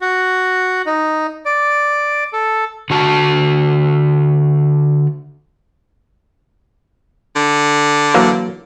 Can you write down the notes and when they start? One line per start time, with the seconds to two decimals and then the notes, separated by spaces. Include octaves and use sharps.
0.01 F#4
0.86 D#4
1.45 D5
2.33 A4
2.90 D3 F#4 A5
7.36 D3
8.14 E3 F#3 A#3